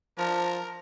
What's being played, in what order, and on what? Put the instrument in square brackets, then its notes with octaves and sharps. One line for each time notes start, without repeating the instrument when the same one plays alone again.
[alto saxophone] F3 [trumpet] A#4 [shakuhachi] A5